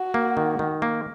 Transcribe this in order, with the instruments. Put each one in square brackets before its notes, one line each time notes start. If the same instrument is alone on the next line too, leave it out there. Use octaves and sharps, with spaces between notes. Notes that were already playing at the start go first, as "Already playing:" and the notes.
Already playing: [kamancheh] F#4
[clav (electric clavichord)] A#3
D#3
D#3
A#3